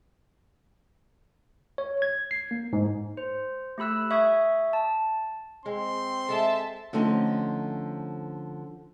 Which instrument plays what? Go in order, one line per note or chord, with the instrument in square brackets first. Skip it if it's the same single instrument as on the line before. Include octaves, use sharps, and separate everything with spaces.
[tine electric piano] C#5
G#6
C7
A#3
G#2
[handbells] C5
A3 G4 B5 E6 F#6
E5 C#6 D#6 G#6
A5
[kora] G#3 [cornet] C4 [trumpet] C6
[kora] G#3 A4 [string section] E5 A5
[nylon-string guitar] D3 F3 A3 C4 C#4 D#4